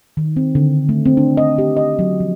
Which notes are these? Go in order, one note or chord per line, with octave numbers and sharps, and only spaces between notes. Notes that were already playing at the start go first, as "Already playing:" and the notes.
D#3
C4
D3
A3
C4
D4
D#5
G4
D#5
F#3
F3